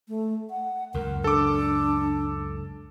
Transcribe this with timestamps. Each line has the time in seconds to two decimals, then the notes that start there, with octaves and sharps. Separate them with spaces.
0.08 A3
0.50 F#5
0.94 C#2 F#2 A#4
1.24 D4 A4 D6